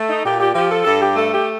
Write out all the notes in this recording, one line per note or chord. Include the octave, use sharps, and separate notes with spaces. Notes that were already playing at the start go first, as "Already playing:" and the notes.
Already playing: A3
D#4
A#2 G4
G4
F3 G4
A4
G2 A4
G4
A3 A4
G4